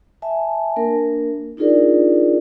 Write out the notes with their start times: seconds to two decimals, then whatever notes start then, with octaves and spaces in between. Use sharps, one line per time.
0.22 E5 G#5 A5
0.76 A#3 D4 A#4
1.57 D4 D#4 F4 G#4 A#4 D5